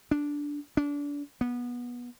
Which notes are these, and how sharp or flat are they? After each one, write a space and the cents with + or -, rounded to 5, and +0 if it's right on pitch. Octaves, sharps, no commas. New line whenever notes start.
D4 -10
D4 -30
B3 -20